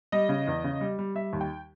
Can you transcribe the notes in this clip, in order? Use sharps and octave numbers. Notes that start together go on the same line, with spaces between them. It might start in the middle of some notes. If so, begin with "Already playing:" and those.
G3 D#5
C#3
E2
C#3
G3
G3
G3 E5
D#2
G5